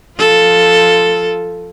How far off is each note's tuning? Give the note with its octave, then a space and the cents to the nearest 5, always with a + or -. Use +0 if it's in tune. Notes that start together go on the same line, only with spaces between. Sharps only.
F3 +0 F4 +0 A4 +0